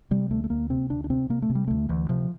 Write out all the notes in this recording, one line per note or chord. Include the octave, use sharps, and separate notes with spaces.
C3 G3
D2 A3
A3
D2 A#3
C3 C4
D2 D4
D4
C3 C4
C3 A#3
A3
C3
G3
D2 A3
D2 E3
C3 F3